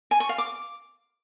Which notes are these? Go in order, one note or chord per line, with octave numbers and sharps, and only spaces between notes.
G#5
C#6
F5
D6